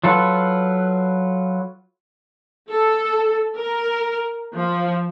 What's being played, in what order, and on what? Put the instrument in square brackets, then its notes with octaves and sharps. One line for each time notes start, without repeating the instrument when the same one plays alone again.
[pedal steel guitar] F#3 F4 A4 B4
[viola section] A4
A#4
F3